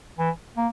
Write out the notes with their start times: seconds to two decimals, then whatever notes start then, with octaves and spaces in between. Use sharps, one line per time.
0.18 E3
0.57 A#3